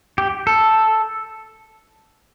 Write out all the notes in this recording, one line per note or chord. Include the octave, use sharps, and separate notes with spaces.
G4
A4